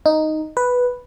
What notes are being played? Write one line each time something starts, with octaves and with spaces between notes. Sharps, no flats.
D#4
B4